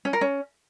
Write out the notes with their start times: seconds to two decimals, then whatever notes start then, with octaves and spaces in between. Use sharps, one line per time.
0.05 C#4
0.13 A#4
0.21 C#4